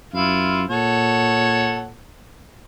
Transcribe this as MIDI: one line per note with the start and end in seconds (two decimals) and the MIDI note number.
0.14 0.67 42
0.14 0.64 64
0.14 0.64 65
0.14 0.64 77
0.69 2.01 46
0.69 1.88 69
0.69 1.88 73
0.69 1.88 78